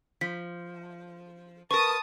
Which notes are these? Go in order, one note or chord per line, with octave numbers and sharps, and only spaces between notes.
F3 B6
A#4 B4 A5 C#6 D#6